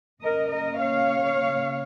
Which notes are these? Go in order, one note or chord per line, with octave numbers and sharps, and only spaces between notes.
C#3 A#3 A#4 D#5
A#4 D#5
C#5 F5